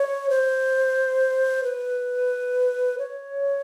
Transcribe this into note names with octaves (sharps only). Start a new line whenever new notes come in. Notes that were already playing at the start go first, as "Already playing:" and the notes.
Already playing: C#5
C5
B4
C#5